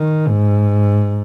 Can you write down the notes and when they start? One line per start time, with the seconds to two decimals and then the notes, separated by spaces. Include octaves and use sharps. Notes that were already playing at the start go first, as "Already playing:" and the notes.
Already playing: D#3
0.28 G#2